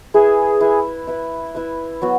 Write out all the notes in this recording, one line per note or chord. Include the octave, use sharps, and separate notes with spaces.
E4 G#4 B4 E5
E4 B4 E5
E4 B4 E5
E4 B4 E5
F#3 B3 F#4